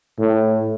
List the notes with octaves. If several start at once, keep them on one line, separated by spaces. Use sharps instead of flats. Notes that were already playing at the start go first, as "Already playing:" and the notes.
A2